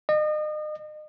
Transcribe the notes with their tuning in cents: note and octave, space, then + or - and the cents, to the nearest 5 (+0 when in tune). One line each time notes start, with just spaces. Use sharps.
D#5 -35